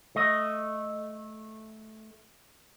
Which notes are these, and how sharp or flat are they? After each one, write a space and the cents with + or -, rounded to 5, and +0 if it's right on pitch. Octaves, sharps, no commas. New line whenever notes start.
A3 -10 D#5 +0